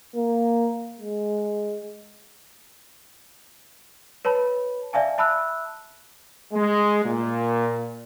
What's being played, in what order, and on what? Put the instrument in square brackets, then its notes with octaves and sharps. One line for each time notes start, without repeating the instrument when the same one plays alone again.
[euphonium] A#3
G#3
[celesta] B4 C#5 A5 B5
D5 E5 F5 G#5 A5
E5 A5 B5 E6 F#6
[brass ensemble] G#3
A#2